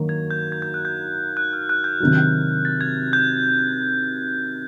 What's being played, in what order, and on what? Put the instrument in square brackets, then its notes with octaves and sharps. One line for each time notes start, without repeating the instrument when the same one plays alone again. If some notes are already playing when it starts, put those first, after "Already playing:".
Already playing: [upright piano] D#3 F#3 A#3
[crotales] G#6
G6
G#6
G6
F#6
G6
F#6
F6
F#6
G6
[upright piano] C3 D#3 F#3
[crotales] A6
G#6
G6